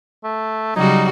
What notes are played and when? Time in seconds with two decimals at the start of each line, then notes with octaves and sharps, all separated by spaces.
0.24 A3
0.76 C#3 F#3 G3 D#4 F#4